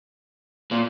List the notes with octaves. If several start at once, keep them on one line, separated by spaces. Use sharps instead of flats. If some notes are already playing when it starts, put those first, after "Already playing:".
A#2